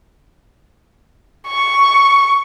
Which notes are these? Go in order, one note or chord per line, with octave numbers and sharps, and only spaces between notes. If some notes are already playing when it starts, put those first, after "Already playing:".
C#6